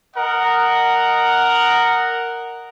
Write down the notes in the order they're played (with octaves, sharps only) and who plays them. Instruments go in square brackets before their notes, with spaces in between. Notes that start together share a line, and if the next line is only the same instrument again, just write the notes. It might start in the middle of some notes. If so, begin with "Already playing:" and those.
[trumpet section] A#4 D#5 F#5